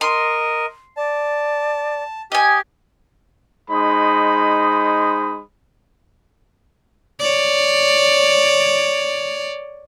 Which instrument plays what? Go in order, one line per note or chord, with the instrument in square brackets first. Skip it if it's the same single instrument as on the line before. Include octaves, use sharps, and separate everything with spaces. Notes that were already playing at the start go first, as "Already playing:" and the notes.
[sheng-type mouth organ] A#4 D#5 [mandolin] C6
[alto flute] D5 [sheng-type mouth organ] A5
[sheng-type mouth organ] G4 [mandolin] D#5 G#5
[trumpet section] G#3 D#4 C5 B5 D#6
[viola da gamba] C#5 D5